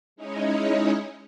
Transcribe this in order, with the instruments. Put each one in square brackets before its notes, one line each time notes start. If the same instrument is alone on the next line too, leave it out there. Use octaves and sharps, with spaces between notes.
[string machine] G#3 C#4 D#4 E4 C#5 D#5